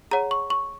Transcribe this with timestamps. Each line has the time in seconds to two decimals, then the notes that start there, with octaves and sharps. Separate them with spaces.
0.11 G#4 C#5 F#5 A#5
0.31 C#6
0.50 C#6